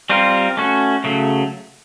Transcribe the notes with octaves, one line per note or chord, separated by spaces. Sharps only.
G3 C4 F4 A#4
A3 C#4 F#4
C#3 F#3 A3